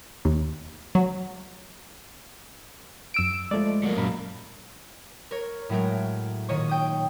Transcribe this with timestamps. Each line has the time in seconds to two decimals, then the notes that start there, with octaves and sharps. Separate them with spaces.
0.25 D#2
0.95 F#3
3.14 F#2 E6 D7
3.51 F3 G#3 A3 D5
3.83 F#3 A#3
3.97 F#2 A#2 A#4 B5
5.31 A#4 C#5
5.69 A2 F#3 G#3 A3 A#4 D7
6.49 A#2 D#3 C#5 D#5 C#6
6.69 G5 D#6